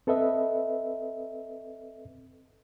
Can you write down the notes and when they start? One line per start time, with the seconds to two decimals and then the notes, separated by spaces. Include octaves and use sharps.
0.07 C4 A4 B4 D#5 E5